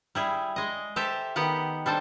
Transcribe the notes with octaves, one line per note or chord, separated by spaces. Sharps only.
G3 E4 G#4
G#3 D#5
G4 A4 C5 E5
D#3 B3 G4 F#5
G3 D4 A4 C5